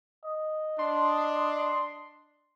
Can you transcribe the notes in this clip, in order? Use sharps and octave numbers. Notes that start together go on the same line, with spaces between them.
D#5
D4 C6